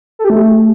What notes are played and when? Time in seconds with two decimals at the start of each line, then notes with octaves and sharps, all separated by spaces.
0.19 A4
0.24 G4
0.30 A3